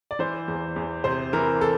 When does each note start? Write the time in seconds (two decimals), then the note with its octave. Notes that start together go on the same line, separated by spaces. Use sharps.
0.11 D5
0.19 E3 C5
0.48 E2
0.76 E2
1.04 C3 C5
1.33 E3 A#4
1.61 A4